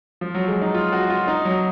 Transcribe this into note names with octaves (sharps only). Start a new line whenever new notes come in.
F3
F#3
G#3
D#4
F4
F#4
F4
D#4
F#3